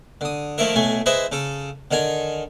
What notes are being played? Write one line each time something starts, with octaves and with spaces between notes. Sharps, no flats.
D3 D#6
D#3 F3 A3 A#3 E4 A#4
B1 A2 A3 G#5
G#3 E4 B4 C5 D#5 E5
C#3 A4
D3 D#3 D#4 G#5